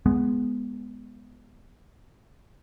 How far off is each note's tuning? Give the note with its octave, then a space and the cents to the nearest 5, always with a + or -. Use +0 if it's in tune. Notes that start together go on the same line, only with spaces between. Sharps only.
G#3 +0 B3 +0